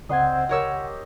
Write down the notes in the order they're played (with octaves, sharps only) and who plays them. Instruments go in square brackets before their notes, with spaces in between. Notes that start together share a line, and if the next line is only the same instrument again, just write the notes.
[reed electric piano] C#2 F#5 G#6 [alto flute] C4 [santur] D#5 C6
[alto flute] G4 [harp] A#4 C#5 E6